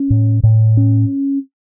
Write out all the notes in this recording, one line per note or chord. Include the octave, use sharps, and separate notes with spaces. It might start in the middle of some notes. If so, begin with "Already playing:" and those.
Already playing: C#4
A2
A2
C#4